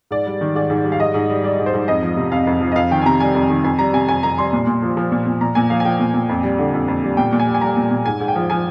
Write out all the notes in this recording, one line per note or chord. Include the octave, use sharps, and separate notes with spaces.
G#2 D5
G3
D#3
G#2 D5
G#2
G3
F5
G#2 D#5
G#2
G3
G3 D5
G#2
C5
G#2
F2 D#5
F3
C3
F2 F5
F2
F3
D#5
F2 F5
D#3 G5
G#5
C3 A#5
G3 G#5
F2
D#3
F2 G#5
G3 A#5
C3 G#5
F2 G#5
F2 A#5
G3 C6
A#2
A#2
F3
F3
A#2
A#2
A#2 A#5
A#2 G#5
F3 F5
G#5
F3 G5
A#2
A#2
F2
G3
D3
F2
F2
G3
A#2 G5
A#2
G#5
G3
G#5
G3 A#5
A#2
A#2
G#2 G#5
G#2
G5
F3
F3 G#5